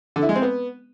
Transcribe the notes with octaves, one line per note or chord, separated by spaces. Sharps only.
D3
E4
G#3
C4
B3